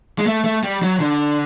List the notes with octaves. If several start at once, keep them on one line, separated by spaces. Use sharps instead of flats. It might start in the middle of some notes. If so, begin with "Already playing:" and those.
G#3
A3
A3
G3
F#3
D3